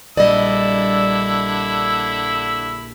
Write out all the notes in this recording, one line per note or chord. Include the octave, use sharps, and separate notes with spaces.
A#1 D3 G3 E4 D5 D#5 E6